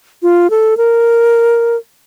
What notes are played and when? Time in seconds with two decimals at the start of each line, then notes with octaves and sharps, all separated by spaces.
0.23 F4
0.50 A4
0.77 A#4